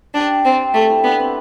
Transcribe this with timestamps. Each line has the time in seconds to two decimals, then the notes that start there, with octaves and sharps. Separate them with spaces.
0.14 D4 G4
0.45 C4
0.74 A3 G4
0.90 E4
1.04 B3 D4
1.20 C4